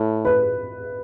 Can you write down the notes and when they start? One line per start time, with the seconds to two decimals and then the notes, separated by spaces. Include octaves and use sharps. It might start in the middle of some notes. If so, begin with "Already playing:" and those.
Already playing: A2
0.25 B4